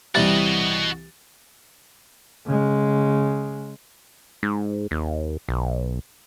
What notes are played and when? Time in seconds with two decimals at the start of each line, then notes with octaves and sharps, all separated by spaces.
0.15 C2 C3 E3 G3 F#4 D#5 A6
2.46 C#3 G#3
4.43 G#2
4.91 D#2
5.49 B1